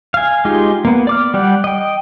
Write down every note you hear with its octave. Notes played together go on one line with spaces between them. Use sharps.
F5 G#5
G#3 D#4 F4 G4 G#4
A#3 B3
D5 D6 F6
G3 G4 D5 F#5
D#5 G5